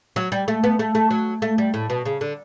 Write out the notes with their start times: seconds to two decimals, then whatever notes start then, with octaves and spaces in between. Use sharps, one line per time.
0.16 F#3
0.32 G3
0.48 A3
0.64 B3
0.79 A3
0.95 A3
1.11 F#3
1.42 A3
1.58 G3
1.74 A2
1.90 B2
2.05 C#3
2.21 D3